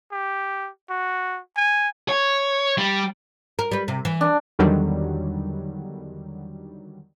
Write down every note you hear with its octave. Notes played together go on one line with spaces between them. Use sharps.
G4
F#4
G#5
C#5
G3
A#4
G3 B4
C3
E3
D4
E2 D3 D#3 F#3 G3